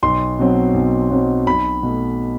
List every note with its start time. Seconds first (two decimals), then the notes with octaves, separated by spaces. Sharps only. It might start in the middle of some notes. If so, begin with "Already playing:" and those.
0.03 B1 C6
0.39 B2 F#3 C4
0.74 B1
1.10 B2 F#3 C4
1.47 B1 B5
1.83 B2 A3